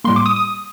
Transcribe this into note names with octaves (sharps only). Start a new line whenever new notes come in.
A2 G3 A#3 C6
D6
D#6
D#6